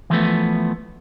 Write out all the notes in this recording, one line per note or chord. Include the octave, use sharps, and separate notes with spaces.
E3 F3 A3 B3